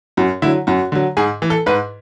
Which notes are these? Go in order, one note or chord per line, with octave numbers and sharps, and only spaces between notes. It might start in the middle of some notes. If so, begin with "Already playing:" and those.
F#2 F#4
D3 F#3 E4
F#2 F#4
D3 F#3
G#2 G#4
E3
A4
G#2 B4